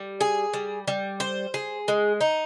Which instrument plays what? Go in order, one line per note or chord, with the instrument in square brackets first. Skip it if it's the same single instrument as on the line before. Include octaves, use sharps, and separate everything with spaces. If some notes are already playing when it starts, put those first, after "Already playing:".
Already playing: [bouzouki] G3
G#4
G3
G3
C5
G#4
G#3
D#4